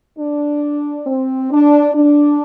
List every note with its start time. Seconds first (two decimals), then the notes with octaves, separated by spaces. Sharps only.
0.17 D4
1.06 C4
1.51 D4
1.95 D4